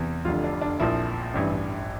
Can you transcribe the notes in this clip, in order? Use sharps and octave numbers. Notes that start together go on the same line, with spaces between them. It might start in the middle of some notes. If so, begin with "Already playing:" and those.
Already playing: E2 C3 E3
F1 F2 D3 F4
D4
D4
A#1 A#2 F3 E4
A1 G2 E3